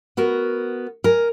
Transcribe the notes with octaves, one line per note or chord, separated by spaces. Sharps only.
B3 F#4 A#4
A#4 G#5